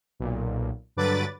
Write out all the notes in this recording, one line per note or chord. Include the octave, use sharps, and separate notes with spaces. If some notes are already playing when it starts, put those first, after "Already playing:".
B1 A#2
G2 D3 F#3 B4 D6 A6